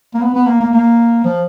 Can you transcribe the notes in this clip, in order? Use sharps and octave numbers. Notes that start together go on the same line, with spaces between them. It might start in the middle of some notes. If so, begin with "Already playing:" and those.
A#3
B3
B3
A#3
A#3
A#3
F3